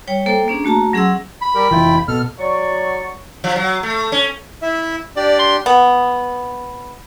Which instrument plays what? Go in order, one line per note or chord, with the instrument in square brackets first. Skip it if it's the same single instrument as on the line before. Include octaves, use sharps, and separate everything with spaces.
[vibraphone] G3 C#5 G5
A#3 A4 C5 G5
A#3 C#4 D4 G#4
A3 F#4 A5 A#5
F#3 C#4 G#4 F#5 C6 E6
[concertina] B5
[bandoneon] G3 G4 A#4
[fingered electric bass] F1 E3 [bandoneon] E4 F4 G5
[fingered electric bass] B2 [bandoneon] A4 [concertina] F6
[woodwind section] F#3 D5 C#6
[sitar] F3
F#3
A3
C#4
[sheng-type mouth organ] E4 E5
[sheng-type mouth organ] D4 G4 [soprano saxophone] D5
[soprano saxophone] C6
[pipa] B3